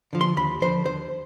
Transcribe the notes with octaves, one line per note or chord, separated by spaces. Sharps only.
D3 F3
C6
D#2 B5
D3 F3 C5
D#2 C5